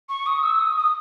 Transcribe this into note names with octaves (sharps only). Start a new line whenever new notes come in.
C#6
D#6
E6
D#6
D#6